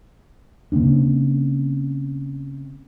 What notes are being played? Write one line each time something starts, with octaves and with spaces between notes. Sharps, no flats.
C#3 A#3 C4 D4